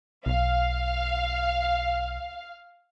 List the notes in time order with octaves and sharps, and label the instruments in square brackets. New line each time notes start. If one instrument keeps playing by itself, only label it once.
[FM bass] B1 [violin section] F5